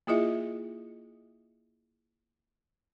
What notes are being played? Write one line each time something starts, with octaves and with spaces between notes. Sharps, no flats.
A#3 E4 F4 G#4 D#5 E5